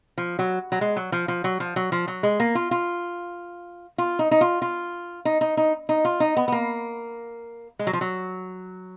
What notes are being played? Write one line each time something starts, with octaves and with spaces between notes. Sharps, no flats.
F3
F#3
F#3
G#3
F#3
F3
F3
F#3
F3
F#3
F3
F#3
G#3
A#3
F4
F4
F4
D#4
D#4
F4
F4
D#4
D#4
D#4
D#4
F4
D#4
B3
B3
A#3
G#3
F#3
F3
F#3